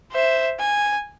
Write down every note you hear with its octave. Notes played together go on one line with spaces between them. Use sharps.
C5 E5
G#5